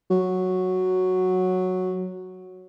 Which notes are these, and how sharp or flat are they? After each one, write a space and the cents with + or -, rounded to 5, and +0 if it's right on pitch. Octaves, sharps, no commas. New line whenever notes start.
F#3 -5